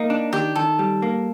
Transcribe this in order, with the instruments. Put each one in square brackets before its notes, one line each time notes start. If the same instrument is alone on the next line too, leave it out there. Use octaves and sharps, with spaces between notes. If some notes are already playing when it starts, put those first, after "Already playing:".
Already playing: [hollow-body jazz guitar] A#3 [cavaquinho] D#4
[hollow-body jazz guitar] D4
[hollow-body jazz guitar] D#3 [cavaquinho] G4
[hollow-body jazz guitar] D#3 [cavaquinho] A4
[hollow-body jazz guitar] G3
A#3